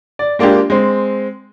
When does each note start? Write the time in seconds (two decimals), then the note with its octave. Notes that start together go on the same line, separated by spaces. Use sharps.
0.19 D5
0.39 G#3 A#3 D4 F4 G4
0.70 G#3 C4